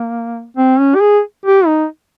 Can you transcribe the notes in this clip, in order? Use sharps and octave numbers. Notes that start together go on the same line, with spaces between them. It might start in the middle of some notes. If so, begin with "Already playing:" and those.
Already playing: A#3
C4
C#4
G4
G#4
G4
D#4